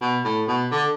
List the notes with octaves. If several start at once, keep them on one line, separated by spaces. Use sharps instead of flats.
B2
A2
B2
D3